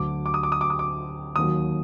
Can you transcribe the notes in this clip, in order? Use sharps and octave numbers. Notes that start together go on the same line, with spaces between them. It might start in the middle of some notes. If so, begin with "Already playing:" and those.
Already playing: D2 D3 F#3 D6
D6
D#6
D6
D#6
D6
D#6
D6
D#2 D#3 F#3 D#6